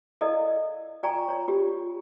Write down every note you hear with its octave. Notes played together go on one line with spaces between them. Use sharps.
E4 A4 A#4 D5 D#5 F5
F4 D5 G5 G#5 A#5 C#6
C#5 A#5
F4 G4